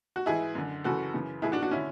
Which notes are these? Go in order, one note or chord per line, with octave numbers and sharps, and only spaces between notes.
F#4
G#2 E3 E4 G#4
F#2 D3
F#2 C#3 E3 F#4 A4
F#2 C#3 E3
A2 E3 E4 G#4
D4 F#4
D4 F#4
D3 C#4 E4